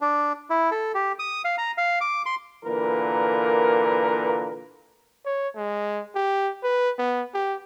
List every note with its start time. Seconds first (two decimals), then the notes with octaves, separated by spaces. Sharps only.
0.01 D4
0.50 E4
0.71 A4
0.95 G4
1.19 D#6
1.45 F5
1.58 A#5
1.78 F5
2.01 D6
2.26 C6
2.64 A#2 D3 E3 A#3 A#4 B4
5.26 C#5
5.56 G#3
6.15 G4
6.63 B4
6.98 B3
7.34 G4